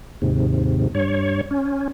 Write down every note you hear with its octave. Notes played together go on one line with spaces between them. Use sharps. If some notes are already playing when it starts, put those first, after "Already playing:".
D#2 G#2 C3
G2 C#5
C#4